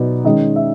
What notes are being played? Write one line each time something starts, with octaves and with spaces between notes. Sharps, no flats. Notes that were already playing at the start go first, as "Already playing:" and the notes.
Already playing: B2 F#3 B3 D#4 D5
D#3 G#3 C#4 D#5
E5